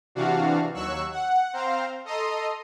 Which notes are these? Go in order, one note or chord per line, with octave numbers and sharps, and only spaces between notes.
C3 E3 D4 F#4 F5
D#2 F#3 C#6 E6 F#6
F#5
C4 C5 F5 A#5
A4 D#5 A#5 C6 D#6